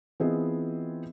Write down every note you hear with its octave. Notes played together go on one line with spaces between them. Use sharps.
E3 B3 C4 F4 G#4 D#5